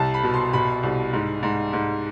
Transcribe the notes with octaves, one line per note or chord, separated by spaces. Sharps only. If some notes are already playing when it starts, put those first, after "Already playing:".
Already playing: C2 A5
B5
B2
C6
B2 B5
C2
G#2
G#2
G#2